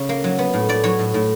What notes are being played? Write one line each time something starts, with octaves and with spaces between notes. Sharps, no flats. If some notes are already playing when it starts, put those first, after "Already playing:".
Already playing: C#3
A#3
F#3
B3
A2
A2 D5
F#3 C#5
A2
A2